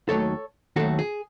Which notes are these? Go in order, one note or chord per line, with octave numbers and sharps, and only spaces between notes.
D#2 D#3 F#3 A3 A4 C#5
D#2 D#3 F#3 A3 F#4 A4
G#4